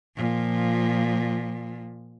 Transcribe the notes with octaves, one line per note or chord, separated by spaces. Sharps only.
A#2 F3